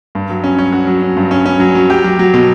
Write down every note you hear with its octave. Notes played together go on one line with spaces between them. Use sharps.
G2
F#3
C#4
C#4
F#4
F#3
C#4
G2
C#4
C#4
F#3
F#3
G4
F#3
F#3
B2